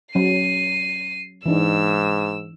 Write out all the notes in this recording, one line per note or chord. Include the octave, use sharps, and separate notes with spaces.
F#3 C#4 C7 D#7
G#2 E3 D4 D#4 E6